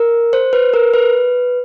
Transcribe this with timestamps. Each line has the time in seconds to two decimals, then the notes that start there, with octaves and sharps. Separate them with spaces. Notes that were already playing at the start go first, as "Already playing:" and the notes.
Already playing: A#4
0.33 C5
0.53 B4
0.74 A#4
0.94 B4